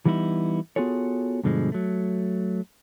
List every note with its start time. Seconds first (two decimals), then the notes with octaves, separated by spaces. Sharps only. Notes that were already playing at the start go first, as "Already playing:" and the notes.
0.06 E3 G3 B3 D#4 E4
0.76 B3 F4 F#4 G#4 A4 C#5
1.43 G2 B2 D3 F3 G#3
1.72 F#3 A3